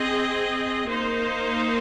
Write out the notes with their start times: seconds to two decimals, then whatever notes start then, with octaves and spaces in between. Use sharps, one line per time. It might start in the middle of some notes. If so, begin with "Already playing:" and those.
Already playing: C4 G#4 D#5
0.88 A#3 D#4 C5